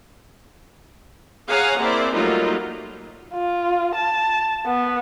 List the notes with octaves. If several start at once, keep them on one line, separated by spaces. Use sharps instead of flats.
G#4 C#5 F5 F#5 G#5 A#5
A#3 C4 E4 C5 D5
F#3 G3 A3 A#3 D#4 F4
F4
A5
B3